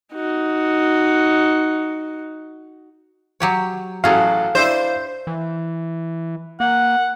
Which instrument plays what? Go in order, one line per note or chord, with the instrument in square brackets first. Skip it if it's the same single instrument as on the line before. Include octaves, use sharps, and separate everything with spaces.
[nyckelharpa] D#4 F#4
[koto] F#3 G4 C#5
[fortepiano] A1 F#3 A4 [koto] F#4 G#4 [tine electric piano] F5
[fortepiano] D4 E4 E5 [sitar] C5
[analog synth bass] E3
[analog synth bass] A#3 [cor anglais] F#5